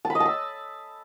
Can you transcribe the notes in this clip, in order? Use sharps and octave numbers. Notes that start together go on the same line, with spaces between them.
A5
B5
D#5
A5
E6